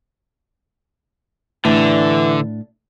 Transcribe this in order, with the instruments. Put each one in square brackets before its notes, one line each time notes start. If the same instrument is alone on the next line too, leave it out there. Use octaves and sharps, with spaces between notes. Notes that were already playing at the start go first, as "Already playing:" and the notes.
[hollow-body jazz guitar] A2 D4 [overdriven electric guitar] D3 [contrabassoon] E3